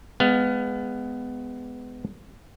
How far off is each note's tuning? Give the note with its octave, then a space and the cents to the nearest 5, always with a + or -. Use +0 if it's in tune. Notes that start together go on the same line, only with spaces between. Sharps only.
G#3 +0 B3 +15 F5 +0